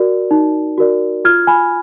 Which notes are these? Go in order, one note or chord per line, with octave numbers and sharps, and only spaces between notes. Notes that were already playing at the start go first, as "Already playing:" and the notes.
Already playing: F#4 A#4 D5
D#4
F#4 A#4 D5
F4 F6 G#6
G#5 B5